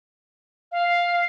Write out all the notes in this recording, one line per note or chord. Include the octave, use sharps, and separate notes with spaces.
F5